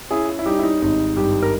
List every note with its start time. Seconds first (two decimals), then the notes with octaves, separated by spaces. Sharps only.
0.11 C#4 E4 G#4
0.29 E4
0.39 E4
0.46 G3 D#4 G4
0.59 E4
0.63 D#4
0.82 G#1 D#4
1.16 G2 D#4 G4
1.42 A#4